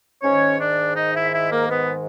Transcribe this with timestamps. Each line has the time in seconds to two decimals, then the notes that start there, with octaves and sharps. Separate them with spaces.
0.23 G#2 D#3 G#3 C#4 C#5
0.60 D4 D5
0.96 D#4 D#5
1.15 E4 E5
1.33 E4 E5
1.51 A#3 A#4
1.70 B3 B4